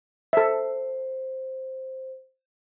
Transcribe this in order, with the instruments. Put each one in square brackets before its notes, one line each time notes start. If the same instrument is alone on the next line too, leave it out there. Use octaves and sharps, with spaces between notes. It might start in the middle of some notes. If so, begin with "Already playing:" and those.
[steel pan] A4 E5 [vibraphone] C5